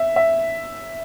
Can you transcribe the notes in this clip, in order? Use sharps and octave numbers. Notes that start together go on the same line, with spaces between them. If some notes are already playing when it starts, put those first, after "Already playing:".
Already playing: E5
E5